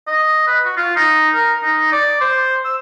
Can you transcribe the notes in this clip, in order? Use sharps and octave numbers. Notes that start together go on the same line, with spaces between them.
D#5
B4
F#4
F4
D#4
A#4
D#4
D5
C5
E6